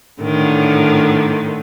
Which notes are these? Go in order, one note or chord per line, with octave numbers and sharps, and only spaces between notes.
A2 D3 D#3